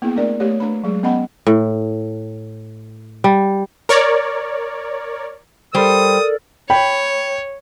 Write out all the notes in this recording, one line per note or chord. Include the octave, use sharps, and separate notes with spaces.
A#3 B3 E4 G#4
A3 D4 A#4 D5
A3 G4 C#5
A3 D4 B4 B5
F#3 G#3 G#4
B3 C#4 D#5 F#5 B5
A2
G3
A#4 C#5 D5
G3 A4 A#4 C5 D5 D#6
C#5 G5 B5